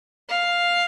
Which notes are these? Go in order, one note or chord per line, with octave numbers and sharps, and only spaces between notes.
F5